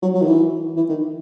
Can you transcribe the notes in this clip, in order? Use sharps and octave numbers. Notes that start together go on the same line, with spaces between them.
F#3
F#3
D#3
E3
E3
D#3